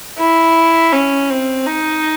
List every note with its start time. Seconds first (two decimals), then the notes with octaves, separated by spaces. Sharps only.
0.18 E4
0.92 C#4
1.30 C4
1.66 D#4